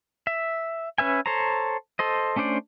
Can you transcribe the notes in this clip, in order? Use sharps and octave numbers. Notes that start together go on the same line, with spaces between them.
E5
C#4 B4 E5 G#5
A4 C5 C#5 A#5
A4 C5 D#5
A3 C#4 D4 C5 D5